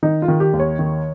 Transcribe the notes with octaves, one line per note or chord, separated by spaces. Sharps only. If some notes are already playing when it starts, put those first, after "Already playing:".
D#3 D#4
F4
D#3
G4
D#2
C#5
D#3